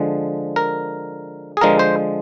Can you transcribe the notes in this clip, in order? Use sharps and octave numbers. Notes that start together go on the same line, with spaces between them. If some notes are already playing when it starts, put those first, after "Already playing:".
Already playing: D3 F3 G#3
A#4
G#4
D3 F3 G#3 A#4
C5